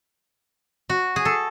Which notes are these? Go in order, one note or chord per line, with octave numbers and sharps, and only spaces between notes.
F#4
G#4
A4